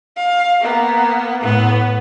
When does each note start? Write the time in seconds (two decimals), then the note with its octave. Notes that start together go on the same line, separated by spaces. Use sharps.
0.17 F5
0.60 A#3 B3
1.42 A2 B3